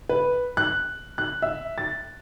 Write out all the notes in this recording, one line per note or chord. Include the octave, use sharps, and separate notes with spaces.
B4
F#6
F#6
E5
A6